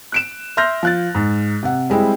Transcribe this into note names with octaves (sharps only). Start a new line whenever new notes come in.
F#6 D7 E7
E5 C6 F6 G6 A#6
F3 F#6 A6
G#2
C3 F#5
G3 G#3 C4 E4